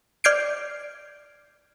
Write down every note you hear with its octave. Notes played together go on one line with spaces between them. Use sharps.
D5 F6 G6 G#6 C7 D7